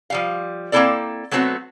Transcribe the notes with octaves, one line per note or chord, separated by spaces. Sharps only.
F3 G3 F5
A#3 C4 D#4 E4 A4 D5
F#3 A3 B3 C4 F4 F#4